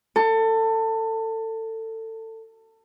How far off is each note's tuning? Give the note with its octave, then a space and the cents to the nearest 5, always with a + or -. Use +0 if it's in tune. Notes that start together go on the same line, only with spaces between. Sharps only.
A4 +25